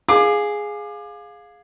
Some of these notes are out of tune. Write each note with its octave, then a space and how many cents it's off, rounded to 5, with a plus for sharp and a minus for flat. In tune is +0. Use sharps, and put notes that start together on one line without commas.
G#4 +0 F5 +15 D6 +30